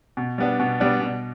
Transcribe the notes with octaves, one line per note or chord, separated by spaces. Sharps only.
B2
G3 B3 D4
B2
G3 B3 D4
B2